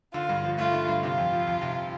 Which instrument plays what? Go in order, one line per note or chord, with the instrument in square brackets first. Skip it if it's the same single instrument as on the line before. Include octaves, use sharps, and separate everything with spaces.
[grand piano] D3 [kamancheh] F4
[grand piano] G2
F3
[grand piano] A3 [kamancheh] F4
[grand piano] D3
G2
[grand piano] C3 [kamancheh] F4
[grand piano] F2
F3
F2
C3